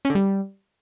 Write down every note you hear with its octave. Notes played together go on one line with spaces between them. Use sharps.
C#4
D3
G3